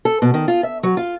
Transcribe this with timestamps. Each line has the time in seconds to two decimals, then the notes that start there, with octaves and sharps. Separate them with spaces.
0.05 A4
0.22 B2
0.34 D#3
0.48 F4
0.63 E5
0.83 F#3
0.97 F4